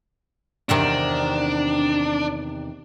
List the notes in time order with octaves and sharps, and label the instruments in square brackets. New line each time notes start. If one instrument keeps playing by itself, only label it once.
[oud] E2 C3 D#3 [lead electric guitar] D4